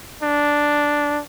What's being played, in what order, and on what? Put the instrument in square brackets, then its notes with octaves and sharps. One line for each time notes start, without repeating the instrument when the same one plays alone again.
[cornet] D4